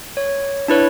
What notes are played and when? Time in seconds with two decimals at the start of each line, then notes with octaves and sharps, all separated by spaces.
0.17 C#5
0.68 D4 E4 B4 C#5